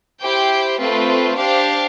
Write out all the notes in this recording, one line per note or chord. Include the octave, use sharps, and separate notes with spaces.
E4 G4 C5 G5
A3 C4 F4 B4
D4 G4 C5 F5